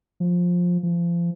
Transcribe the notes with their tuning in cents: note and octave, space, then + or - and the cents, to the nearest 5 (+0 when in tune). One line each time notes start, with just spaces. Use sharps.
F3 +15
F3 -30